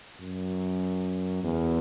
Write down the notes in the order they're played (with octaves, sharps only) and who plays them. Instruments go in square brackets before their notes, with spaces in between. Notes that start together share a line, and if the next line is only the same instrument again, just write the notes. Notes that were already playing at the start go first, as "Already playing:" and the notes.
[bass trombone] F#2
E2